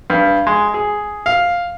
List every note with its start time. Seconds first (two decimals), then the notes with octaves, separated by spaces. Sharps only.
0.10 G2
0.47 G#3
0.74 G#4
1.26 F5